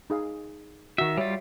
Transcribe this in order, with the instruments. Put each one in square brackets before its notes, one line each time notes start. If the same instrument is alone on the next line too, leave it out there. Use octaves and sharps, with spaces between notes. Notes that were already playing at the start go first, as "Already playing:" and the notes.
[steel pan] D#4 G#4 F5
[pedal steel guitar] D#3 E5 [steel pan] F#4
[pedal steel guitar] G3 F4 [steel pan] C#5 E5